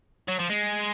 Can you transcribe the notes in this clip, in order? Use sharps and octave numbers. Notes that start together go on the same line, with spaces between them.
F#3
F3
G#3